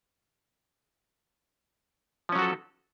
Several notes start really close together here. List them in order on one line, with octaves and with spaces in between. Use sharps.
F3 C#4 F#3 F#4 A4